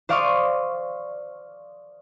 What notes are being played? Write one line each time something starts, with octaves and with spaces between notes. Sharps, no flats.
C5 D5 F5 C6 C#6 D#6